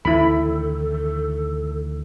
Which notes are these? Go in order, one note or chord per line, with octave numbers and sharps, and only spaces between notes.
D2 D#3 E3 E4 A4 B5